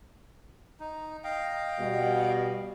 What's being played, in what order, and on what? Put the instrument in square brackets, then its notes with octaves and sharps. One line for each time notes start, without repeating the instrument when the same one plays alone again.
[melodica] D#4
D#5 F5 G5
[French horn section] B2 G3